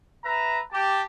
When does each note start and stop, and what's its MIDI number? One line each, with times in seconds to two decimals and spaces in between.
0.24 0.60 71
0.24 0.60 76
0.24 0.60 82
0.71 1.01 67
0.71 1.01 81